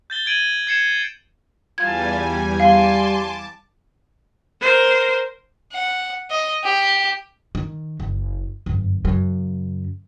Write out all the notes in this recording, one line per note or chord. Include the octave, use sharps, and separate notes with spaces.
G6 A6 G7
G#6 D7 D#7 F#7
G#6 C7 C#7 E7
E2 G3 F4 G#5 A5 G#6
G3 F5 G#5 A5 C6 D6
A#4 C5
F#5
D#5
G4
D#3
F#1
G1 F#2
F#2 C#3